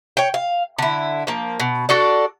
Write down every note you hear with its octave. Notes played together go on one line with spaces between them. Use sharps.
C#5 G5
F5
D3 E4
F3 A#3
B2
D4 F#4 A4 D5